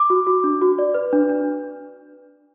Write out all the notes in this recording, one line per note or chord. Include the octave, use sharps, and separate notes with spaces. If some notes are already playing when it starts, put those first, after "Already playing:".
Already playing: D6
F#4
F#4
D4
F#4
D5
B4
D4
D4